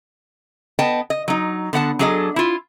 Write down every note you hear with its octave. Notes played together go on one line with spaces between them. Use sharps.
B3 D#5 G5 A5
D#5
F#3 D#4
D3 B3 F#5 A5
F#3 D4 G#4 A4 D#5
E4 F4